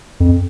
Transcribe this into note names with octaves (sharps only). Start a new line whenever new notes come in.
F2